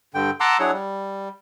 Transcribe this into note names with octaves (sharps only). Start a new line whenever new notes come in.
G2 D3 G5
F#5 A5 A#5 C6 D6 E6
F#3 D4 E4 G#4 C#5 F#5
G3